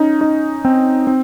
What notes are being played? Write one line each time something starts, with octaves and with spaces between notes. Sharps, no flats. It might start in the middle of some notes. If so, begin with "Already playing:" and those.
Already playing: C#4 D#4
D#4
C4
C4